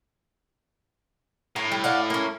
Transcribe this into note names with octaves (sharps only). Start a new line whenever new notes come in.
A2 A#4
G3
D5 F5 F#5
A#3 C#4